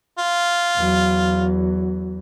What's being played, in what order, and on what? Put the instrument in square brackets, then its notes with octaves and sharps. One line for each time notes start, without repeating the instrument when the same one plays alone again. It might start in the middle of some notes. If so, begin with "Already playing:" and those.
[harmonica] F4
[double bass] E2 F#3